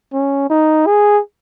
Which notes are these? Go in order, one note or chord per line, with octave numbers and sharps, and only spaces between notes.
C#4
D#4
G#4